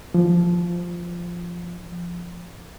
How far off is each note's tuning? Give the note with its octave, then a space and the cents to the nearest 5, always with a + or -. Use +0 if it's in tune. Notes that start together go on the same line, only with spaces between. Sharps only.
F3 -5